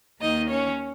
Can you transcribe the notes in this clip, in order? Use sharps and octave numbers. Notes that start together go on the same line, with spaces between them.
D#2 D#3 A#3 D#4 D#5
C#4 C#5